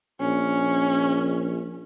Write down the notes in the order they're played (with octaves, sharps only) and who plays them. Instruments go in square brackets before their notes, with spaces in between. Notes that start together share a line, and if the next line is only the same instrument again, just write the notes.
[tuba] A#1 [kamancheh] C#4